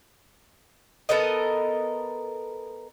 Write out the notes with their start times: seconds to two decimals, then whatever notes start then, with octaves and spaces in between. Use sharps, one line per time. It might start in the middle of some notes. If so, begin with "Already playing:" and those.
1.09 B3 A4 A#4 D#5